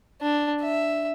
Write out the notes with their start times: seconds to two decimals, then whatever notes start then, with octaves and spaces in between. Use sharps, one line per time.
0.21 D4
0.62 E5